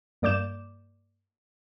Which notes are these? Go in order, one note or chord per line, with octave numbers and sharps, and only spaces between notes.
G2 A#3 D5 D6 G6 E7